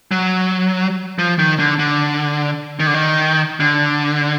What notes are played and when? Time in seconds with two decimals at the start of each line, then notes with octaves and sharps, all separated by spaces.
0.11 F#3
1.19 F3
1.39 D#3
1.59 D3
1.79 D3
2.80 D#3
2.87 D3
2.94 D#3
3.60 D3